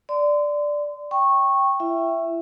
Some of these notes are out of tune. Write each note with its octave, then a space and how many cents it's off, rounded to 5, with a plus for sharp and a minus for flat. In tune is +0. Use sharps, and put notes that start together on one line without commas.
D5 +0 C6 -30
G5 +0 C#6 -15
E4 +30 E5 +5